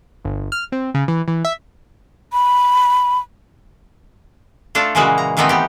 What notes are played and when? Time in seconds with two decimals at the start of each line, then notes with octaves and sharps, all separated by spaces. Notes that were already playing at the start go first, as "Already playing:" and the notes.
0.25 G1
0.52 F6
0.72 C4
0.94 C#3
1.08 E3
1.28 E3
1.45 E5
2.33 B5
4.75 A3 D4 F4 A4 F5
4.95 A#2 C#3 E3 G#3 A#3 F#4
5.18 A#5
5.37 D#3 E3 A3 B3 C4 D#4
5.49 B3 G4